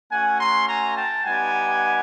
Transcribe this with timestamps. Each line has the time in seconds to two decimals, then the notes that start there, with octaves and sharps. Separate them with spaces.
0.12 A3 C#4 F#4 F#5 G#5
0.40 A#5 C6
0.68 G#5 A#5
0.97 G5 A5
1.25 G3 B3 D#4 G4 F#5 G#5